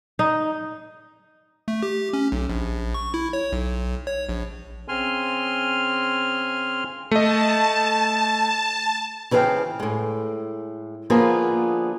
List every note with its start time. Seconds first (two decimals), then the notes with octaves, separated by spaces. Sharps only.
0.19 D#4
1.68 A3
1.83 G4
2.13 C#4
2.32 B1
2.49 A#1
2.94 C#6
3.14 E4
3.33 C#5
3.52 B1
4.07 C#5
4.29 A#1
4.88 C#3 C4 G#5 C6 F6
7.11 A3 D#5 A5
9.31 C#3 E3 F3 A#4 F5 G5
9.80 A2 G#3
11.10 D3 F3 A#3 B3 F4 G#4